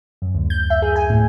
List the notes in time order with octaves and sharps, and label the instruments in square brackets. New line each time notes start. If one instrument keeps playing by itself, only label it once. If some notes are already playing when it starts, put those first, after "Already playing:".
[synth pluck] F#2
D2
G6
E5
G#4
G#5
A2